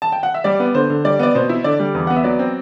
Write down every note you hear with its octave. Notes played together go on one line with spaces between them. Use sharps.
A5
G5
F#5
E5
G3 D5
B3
D3 C5
D3
G3 D5
B3 D5
B2 C5
E4
D3 D5
G3
E2
B3 F#5
E5
F#3 D5
C4